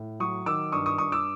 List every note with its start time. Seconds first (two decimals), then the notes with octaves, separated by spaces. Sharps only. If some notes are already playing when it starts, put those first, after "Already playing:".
Already playing: A2
0.20 F#3 C#6 D#6
0.46 D#3 D6 E6
0.72 G2 C#6 D#6
0.86 C#6 D#6
0.98 G2 C#6 D#6
1.12 D6 E6